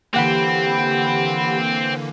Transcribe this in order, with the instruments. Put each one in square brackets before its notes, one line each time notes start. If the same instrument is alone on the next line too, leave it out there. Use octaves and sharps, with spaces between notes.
[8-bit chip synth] D3 E3 A#3 [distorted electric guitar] C4 [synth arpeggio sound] G4 F#5 B5